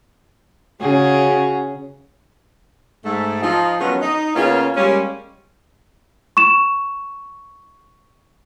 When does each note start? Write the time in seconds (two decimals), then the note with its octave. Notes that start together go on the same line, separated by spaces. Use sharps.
0.81 C#3 C#4 F#4 G#4
3.05 G#2 A3
3.42 F3 D#4
3.80 D#3 F3 F#3 G#3 B3 C#4
4.01 D#4
4.35 C#3 A#3 B3 C#4 F4
4.76 G3 G#3 A#3 C#4
6.37 C#6 E7